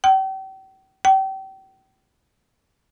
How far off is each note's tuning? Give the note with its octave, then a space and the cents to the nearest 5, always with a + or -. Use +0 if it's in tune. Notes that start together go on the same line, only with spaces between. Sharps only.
G5 -40
G5 -30